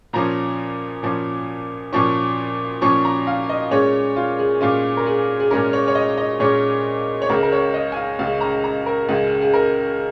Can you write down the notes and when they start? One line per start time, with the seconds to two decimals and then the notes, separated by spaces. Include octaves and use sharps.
0.13 A#2 F3 C#4 A#5
1.03 A#2 F3 C#4
1.93 A#2 F3 C#4 C#6
2.82 A#2 F3 C#4 C#6
3.05 A#5
3.27 F5
3.49 D#5
3.71 A#2 G#3 C#4 C#5
4.16 F4
4.39 G#4
4.61 A#2 G#3 C#4 F4
4.97 A#4
5.06 G#4
5.40 G#4
5.51 A#2 G#3 C#4 A#4
5.73 C#5
5.88 C#5
5.95 D#5
6.17 D#5
6.40 A#2 G#3 C#4 C#5
7.22 C#5
7.29 C#2 C#3 G#3 A#4
7.43 A#4
7.52 C#5
7.74 D#5
7.92 G#5
7.96 F5
8.19 C#2 C#3 G#3 F5
8.41 A#5
8.64 A#5
8.86 A#4
9.08 C#2 C#3 G#3 G#4
9.42 G#4
9.54 A#4